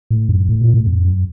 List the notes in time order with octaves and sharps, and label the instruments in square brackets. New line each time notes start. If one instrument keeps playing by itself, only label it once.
[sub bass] A2
F#2
A2
A#2
A2
F2
F#2